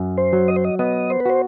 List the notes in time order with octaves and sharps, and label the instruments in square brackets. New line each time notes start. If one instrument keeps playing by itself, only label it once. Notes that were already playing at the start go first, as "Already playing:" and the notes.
Already playing: [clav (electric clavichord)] F#2
[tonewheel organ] C5
[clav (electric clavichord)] F#3
[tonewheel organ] D#5
C5
D#5
[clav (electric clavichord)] B3 [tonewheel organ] D#5
[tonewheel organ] C5
B4
[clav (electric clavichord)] F#4 [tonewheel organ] C5